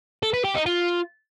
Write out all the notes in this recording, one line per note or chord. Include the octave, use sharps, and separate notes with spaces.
A4
B4
G4
D#4
F4